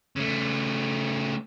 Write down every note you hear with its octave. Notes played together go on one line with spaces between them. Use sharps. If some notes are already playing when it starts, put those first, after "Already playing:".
C#3 A3